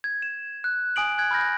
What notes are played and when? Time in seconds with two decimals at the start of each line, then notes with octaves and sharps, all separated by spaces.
0.04 G#6
0.22 E7
0.64 F#6
0.96 G#5 D#6 D7 F#7
1.18 F#6 G#6
1.31 B5 F6 G6 A#6